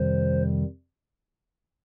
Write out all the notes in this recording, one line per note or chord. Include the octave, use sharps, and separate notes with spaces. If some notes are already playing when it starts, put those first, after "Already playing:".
Already playing: F2 C3 D#3 G3 C5